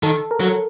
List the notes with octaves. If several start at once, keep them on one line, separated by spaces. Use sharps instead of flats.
D#3 A4
A#4
F#3